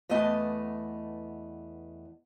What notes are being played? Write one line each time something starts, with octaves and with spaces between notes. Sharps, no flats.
E2 A3 B3 D#5 A5